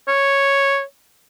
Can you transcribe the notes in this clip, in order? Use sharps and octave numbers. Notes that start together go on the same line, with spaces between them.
C#5